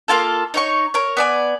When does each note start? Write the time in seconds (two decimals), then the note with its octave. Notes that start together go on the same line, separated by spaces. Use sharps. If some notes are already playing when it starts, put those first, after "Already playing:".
0.08 A#3 C4 F4 A4
0.54 D#4 C#5 C#6
0.94 A#4 C#5
1.17 B3 D5 G#5